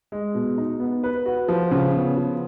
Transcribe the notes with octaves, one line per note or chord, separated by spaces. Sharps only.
G#3
B2
D#4
B3
B4
F#4
F3
C#3
B3
F3